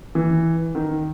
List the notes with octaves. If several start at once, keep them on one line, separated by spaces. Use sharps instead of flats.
E3
D#3